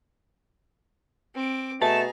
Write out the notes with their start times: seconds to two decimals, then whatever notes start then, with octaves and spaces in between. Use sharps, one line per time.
1.35 C4 D6
1.81 B2 A3 G#4 A5 A#5